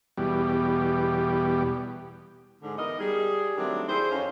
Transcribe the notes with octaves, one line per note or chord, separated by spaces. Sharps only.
E2 B2 G3
G#2 D3
E3 B3 D#4 A#4 D#5
G3 G#4
D#3 F#3 G3 A3 C4 D4
D#3 E4 G#4 C5
F2 C#4